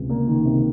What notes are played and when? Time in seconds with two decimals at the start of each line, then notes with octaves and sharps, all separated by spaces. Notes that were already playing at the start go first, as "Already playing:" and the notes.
Already playing: C#2 C3
0.10 A#3
0.28 D#3
0.45 C3